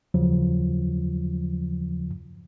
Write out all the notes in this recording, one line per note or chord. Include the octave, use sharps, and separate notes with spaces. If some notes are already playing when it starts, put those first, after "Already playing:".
D#2 C#3 F3 F#3